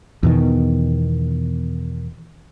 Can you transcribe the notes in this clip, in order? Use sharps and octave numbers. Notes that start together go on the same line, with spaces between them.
E2 B2 D#3